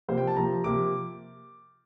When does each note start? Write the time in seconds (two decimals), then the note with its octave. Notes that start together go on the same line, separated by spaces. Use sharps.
0.08 C3 F3 A#3 C5
0.18 G5
0.27 A5
0.36 C3 F3 A#3 A#5
0.64 C3 F3 A#3 D6